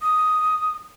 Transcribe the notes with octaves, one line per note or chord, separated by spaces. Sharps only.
D#6